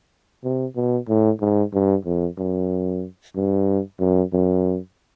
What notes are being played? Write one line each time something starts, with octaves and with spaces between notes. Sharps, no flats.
C3
B2
A2
G#2
G2
F2
F#2
G2
F#2
F#2